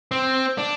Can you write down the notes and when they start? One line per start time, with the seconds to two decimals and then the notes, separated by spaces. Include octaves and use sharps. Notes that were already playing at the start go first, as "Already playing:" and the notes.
0.11 C4
0.58 D4